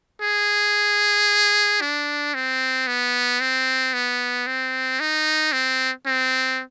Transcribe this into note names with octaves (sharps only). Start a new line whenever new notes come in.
G#4
D4
C4
B3
C4
B3
C4
D#4
C4
C4